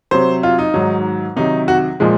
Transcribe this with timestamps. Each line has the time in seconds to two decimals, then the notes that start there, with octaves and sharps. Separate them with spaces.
0.11 C3 F#3 C5
0.43 F4
0.59 D#4
0.74 G#2 D#3 F#3
1.36 C3 D#3 F#3 D#4
1.68 F#4
2.00 A#2 F3 G#3